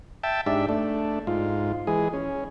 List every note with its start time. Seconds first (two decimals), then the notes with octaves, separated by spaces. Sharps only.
0.23 E5 G5 A5
0.46 G#2 D4 G4 E5
0.69 A3 D4
1.27 G#2 F4
1.87 E3 G#3 G#4
2.13 C#4